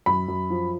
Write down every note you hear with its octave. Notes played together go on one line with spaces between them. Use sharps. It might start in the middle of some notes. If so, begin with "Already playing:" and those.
F#2 B5
F#2
F3